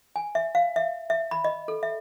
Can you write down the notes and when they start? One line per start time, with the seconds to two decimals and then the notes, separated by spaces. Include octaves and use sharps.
0.16 G#5
0.35 E5
0.55 F5
0.76 E5
1.10 E5
1.31 B5
1.44 D#5
1.68 A4
1.83 E5